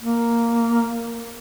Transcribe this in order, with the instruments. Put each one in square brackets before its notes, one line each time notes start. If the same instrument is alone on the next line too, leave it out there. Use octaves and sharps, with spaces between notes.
[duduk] A#3